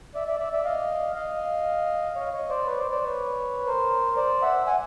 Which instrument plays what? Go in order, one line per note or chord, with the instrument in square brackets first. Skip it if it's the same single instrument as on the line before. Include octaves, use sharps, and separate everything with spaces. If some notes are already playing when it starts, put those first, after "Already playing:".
[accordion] D5 E5
D5 E5
D5 E5
D5 E5
D#5 F5
D#5 F5
C#5 D#5
C#5 D#5
C5 D5
B4 C#5
C5 D5
C5 D5
B4 C#5
A#4 C5
C5 D5
E5 F#5
F#5 G#5